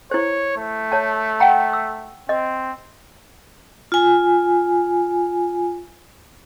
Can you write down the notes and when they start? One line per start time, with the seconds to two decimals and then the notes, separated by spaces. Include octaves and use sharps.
0.11 E4 C5 C#5
0.57 A3
0.92 C#5 A5
1.40 F#5 G5 A#5
1.73 E6
2.29 C4 D#5
3.92 F4 G#5